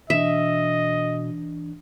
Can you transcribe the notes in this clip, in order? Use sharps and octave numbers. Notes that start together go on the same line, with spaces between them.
B2 E3 D4 D#5 E5